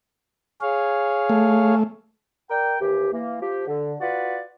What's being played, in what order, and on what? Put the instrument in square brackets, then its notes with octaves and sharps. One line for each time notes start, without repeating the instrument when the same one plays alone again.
[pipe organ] G#4 C#5 F5
[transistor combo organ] A3
[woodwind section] A#4 D5 G5
D#2 E3 G4
E3 A#3
F3 G4
D3
F4 F#4 B4 D5 F#5